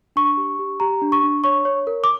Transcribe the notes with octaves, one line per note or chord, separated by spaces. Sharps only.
D4 C#6
G4
G4
G4 A#5
D4
C#6
D4
C#5 C#6
C#5
A#4
D6